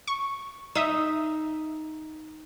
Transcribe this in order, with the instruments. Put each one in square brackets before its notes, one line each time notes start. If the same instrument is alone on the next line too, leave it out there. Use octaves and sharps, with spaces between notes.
[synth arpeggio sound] C#6
[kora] D#4 [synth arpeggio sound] E5 D#6